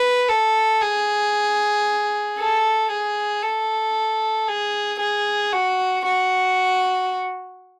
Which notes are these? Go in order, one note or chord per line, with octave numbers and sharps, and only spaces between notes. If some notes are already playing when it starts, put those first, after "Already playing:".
Already playing: B4
A4
G#4
A4
G#4
A4
G#4
G#4
F#4
F#4